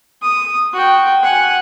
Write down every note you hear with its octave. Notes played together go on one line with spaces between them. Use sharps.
D#6
F#4 G5
F#5 G#5